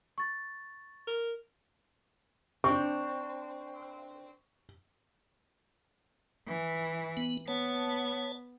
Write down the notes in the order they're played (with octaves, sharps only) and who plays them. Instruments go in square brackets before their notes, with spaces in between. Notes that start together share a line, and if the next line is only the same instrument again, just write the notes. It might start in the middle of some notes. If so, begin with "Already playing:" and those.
[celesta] C#6 A6
[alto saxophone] A#4
[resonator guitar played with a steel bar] C4 D4 [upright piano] C#6
[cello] E3
[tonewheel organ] B3
[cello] B3 [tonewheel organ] C#5 A5